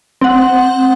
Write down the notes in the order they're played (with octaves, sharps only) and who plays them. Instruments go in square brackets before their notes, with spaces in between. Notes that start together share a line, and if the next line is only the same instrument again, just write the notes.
[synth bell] C4 F#5